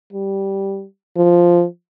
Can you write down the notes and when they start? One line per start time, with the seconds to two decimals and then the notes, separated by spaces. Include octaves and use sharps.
0.13 G3
1.16 F3